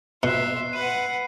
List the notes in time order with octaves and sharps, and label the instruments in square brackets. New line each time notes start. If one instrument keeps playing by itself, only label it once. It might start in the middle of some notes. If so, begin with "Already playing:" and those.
[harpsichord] B2 [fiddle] F4 E5 [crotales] F#6 C7
[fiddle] B4 F#5 [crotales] D#7